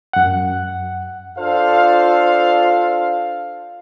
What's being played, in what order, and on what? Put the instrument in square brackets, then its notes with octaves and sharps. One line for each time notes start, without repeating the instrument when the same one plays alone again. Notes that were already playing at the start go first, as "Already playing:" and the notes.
[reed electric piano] F#2 F#5
[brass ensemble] D4 F4 A4 C5 F5